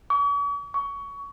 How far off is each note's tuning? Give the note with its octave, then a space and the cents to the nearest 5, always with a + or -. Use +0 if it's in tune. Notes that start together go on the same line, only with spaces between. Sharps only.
C#6 +45
C#6 +20